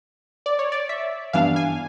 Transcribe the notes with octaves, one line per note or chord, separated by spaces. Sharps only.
D5
C#5
D5
E5
G2 E3 G3 B3 D4 F5
G#5